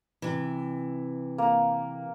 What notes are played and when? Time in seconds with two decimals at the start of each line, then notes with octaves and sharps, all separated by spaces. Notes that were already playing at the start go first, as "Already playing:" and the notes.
0.22 C3 E3
1.38 A#3